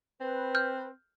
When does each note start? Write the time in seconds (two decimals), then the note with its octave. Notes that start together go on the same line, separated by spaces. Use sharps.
0.21 C4 B4
0.55 F6 G6